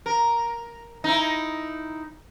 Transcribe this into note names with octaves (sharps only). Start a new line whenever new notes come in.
A#4
D#4 E4